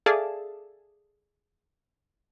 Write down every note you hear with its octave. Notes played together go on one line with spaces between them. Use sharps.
G#4 A4 D5 E5 F5 A5